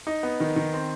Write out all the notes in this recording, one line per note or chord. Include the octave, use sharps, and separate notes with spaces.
D#4
B3
D#3
D#3
C4